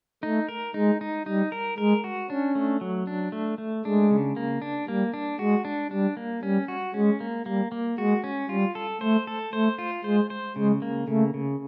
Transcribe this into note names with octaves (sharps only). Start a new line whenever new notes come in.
A3 D#4
A#4
G#3 D#4
D#4
G3 D#4
A#4
G#3 A#4
F#4
C#4 D4
A3
F#3
D4
A3
A3
G#3 D4
C#3
A#3
D4
G3 A#3
D4
G#3 F#4
D4
G3 D4
A#3
G3 C#4
F#4
G#3 C#4
A#3
G3 A#3
A#3
G#3 F#4
C#4
G3 F4
A4
A3 C5
A4
A3 C5
F4
G#3 C5
C5
C#3 G#3
A#3
C#3 A3
C#3